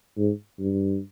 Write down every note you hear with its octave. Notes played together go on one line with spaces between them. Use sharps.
G#2
G2